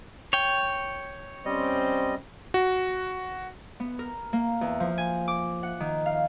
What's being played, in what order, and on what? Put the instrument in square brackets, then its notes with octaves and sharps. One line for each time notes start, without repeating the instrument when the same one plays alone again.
[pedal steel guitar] C#5 G5
[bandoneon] G3 D#5 [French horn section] C4 C#4
[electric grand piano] F#4
[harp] B3
A#4
A#3
E2
F3
G#5
D6
F#5
D#3
F5